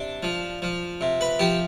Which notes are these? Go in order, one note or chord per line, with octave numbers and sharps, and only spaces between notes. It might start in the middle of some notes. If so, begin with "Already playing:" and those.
Already playing: C3 D4
F3
F3
C3
B4
F3 G4